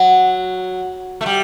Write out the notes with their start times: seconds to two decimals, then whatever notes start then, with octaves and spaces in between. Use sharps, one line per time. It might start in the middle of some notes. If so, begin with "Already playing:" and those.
Already playing: F#3
1.21 A3
1.26 G3